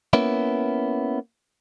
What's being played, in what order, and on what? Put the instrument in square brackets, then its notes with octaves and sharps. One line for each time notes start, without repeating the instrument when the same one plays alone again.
[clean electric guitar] A#3 B3 C#4 E4